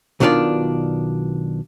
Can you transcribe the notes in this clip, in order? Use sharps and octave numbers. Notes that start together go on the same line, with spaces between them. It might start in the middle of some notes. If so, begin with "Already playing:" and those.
B1 B2 D#3 D4 F4 D5